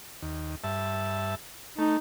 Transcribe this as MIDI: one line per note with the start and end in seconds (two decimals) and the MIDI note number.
0.22 0.56 39
0.64 1.35 43
0.64 1.35 76
0.64 1.35 81
1.78 1.97 57
1.78 1.98 63